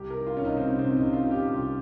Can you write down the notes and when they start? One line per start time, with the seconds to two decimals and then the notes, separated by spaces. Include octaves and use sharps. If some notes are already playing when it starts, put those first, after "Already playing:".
Already playing: C2 G4
0.10 A#4
0.19 D#3
0.27 F4
0.37 C#4
0.44 C2 D#4
0.57 C4
0.61 C#4
0.70 C3
0.79 C4
0.97 C2 D#4
1.13 F4
1.22 D#3
1.31 G4
1.48 C2 F4